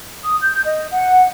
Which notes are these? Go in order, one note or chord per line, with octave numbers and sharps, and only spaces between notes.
D#6
G6
D#5
F#5